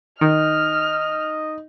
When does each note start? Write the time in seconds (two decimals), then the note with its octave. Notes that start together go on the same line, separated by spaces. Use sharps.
0.21 D#3 D#4 D#5 F6